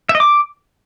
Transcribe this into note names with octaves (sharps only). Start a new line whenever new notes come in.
E5
D#5
D6